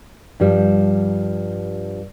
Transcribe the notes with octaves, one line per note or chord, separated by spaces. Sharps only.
G2 F3 G3